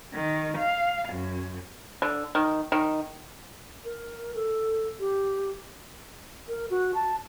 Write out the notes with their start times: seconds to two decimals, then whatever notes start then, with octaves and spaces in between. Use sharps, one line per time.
0.14 D#3
0.58 F5
1.10 F#2
2.02 D3
2.35 D#3
2.72 D#3
3.85 A#4
4.35 A4
5.00 G4
6.48 A#4
6.70 F#4
6.94 A5